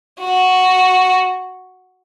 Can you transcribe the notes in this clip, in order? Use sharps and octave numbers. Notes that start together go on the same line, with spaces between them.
F#4